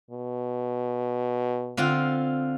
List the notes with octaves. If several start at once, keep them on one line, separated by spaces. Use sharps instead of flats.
B2
D3 C4 F4